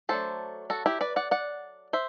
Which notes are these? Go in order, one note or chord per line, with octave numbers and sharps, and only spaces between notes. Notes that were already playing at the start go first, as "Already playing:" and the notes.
F#3 A3 D4 A4 C5
F#4 A4
E4 G4
B4 D5
D5 F#5
D5 F#5
C5 E5